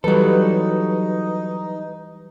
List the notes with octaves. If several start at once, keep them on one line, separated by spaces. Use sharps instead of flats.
E3 F#3 G3 D#4 A4 B4